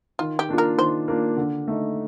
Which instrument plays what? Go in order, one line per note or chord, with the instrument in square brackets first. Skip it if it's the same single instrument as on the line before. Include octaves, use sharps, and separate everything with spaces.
[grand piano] D#3 [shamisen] F4
[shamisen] G4
[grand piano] A#3 D4 F4
[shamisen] A#4
[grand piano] D#3 [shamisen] C5
[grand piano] A#3 D4 F4
D3
A3 D#4